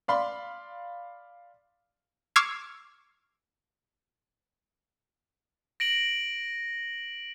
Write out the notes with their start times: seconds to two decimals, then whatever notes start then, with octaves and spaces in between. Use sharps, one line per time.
0.08 D5 F5 B5 C6
2.36 C#6 D6 E6 F6 G#6 C7
5.80 A#6 D7 F#7